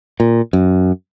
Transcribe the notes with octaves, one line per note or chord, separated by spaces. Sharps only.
A#2
F#2